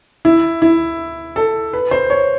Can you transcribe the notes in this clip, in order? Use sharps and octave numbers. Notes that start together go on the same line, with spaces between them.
E4
E4
A4
B4
C5
C#5